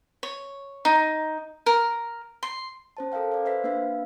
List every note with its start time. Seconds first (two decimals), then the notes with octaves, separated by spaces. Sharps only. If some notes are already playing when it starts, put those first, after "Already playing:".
0.23 C#5
0.85 D#4
1.66 A#4
2.43 C6
2.97 C#4 C5 A5
3.12 A4 A#4 C5 F5 G5
3.32 D5 F5
3.45 B4 C5 E5 B6
3.64 A#3 D4 B4 E5 F5